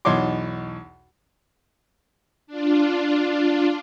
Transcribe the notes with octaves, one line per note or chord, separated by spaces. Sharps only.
B1 E2 D#4 C#5 C6 D6
D4 F4